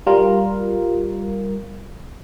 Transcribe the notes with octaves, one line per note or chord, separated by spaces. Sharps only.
G3 F4 A#4